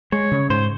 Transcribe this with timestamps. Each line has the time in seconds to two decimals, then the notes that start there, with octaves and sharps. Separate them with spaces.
0.12 G#3 C#5
0.32 C#3
0.50 G#2 C5